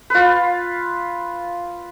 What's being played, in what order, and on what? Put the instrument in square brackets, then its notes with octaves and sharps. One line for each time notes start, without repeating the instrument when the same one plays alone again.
[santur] F4 B4